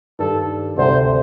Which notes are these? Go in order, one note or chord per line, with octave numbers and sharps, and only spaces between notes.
G2 D#3 G3 D4 A4
D2 C3 G3 C5